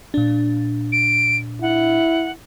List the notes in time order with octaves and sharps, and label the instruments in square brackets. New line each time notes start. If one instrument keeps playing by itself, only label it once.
[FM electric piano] A#2 D4
[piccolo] D7
[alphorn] E4 [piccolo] F#5